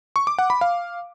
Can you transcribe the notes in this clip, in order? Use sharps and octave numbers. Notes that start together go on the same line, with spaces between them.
C#6
D6
F#5
B5
F5